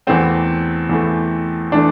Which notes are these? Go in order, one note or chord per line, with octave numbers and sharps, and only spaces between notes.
E2 E3 A3 C4
E2 E3 A3
E3 A3 D4